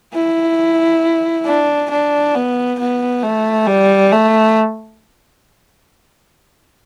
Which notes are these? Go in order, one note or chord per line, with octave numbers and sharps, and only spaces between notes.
E4
D4
D4
B3
B3
A3
G3
A3